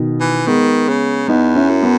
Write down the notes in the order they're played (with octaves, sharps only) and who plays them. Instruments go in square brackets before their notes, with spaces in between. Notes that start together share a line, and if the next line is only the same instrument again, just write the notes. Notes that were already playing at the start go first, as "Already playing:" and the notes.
Already playing: [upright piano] B2 D#3
[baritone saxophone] E3
[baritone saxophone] D#3 [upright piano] G#3 B3
[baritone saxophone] C#3
[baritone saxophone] E2 [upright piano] B3 D#4
[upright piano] C#4 E4
[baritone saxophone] F#2
[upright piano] B3